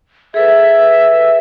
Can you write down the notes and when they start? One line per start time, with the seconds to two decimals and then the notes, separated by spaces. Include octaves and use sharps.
0.34 G#4 A4 B4 E5